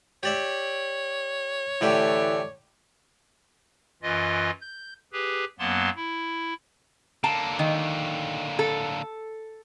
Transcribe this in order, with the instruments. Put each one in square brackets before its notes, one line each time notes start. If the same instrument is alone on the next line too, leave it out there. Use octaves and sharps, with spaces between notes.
[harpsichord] G4 D5 E5 [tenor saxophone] C#5
[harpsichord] A2 D3 G4 [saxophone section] E3 A3 D5
[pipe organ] F#2 E3 F4 D#5
G6
G4 G#4 B4
F#2 F#3 A#3 B3 A5 C6
E4
[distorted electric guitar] D3 A#3 [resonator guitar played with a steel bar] A5
[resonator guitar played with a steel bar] D#3
A4